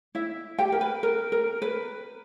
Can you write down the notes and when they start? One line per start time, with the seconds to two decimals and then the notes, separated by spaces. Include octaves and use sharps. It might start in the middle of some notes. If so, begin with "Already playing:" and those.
0.15 E4 E5
0.59 G4 G5
0.72 A#4
0.81 B4
1.03 A#4
1.32 A#4
1.62 B4